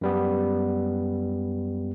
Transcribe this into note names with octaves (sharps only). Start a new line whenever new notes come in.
F#2 G3 B3